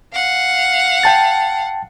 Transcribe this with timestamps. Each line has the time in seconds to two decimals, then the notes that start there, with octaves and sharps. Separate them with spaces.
0.13 F5 F#5
1.03 G5 A5 A6